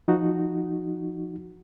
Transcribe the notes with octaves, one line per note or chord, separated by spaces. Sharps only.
F3 D#4 F#4